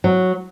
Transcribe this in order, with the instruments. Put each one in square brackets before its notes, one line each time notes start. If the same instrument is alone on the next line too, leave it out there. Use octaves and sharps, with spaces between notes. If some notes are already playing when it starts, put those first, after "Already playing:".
[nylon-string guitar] F#3